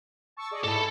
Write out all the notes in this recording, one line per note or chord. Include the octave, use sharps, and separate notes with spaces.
A5 C#6 E6
G#4 D5 D#5
G#2 E4 A4 A5